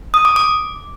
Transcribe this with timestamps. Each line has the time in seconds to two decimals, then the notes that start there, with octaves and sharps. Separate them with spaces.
0.14 D#6
0.25 D6
0.36 D6